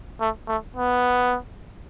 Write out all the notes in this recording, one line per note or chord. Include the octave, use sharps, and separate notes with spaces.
A3
A3
B3